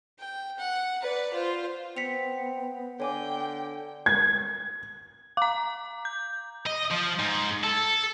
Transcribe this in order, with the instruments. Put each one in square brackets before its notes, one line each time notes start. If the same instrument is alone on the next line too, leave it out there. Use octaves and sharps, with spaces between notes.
[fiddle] G5
F#5
B4 D5
F4 C5
[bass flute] B3 [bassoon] C4 [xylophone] B6 C#7 F7
[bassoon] D3 [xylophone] C#5 G#5 D6 [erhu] G5
[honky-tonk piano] G#6
[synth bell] F5 A#5 [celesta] D6
[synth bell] G6
[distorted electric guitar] D#5
F3
G#2
A4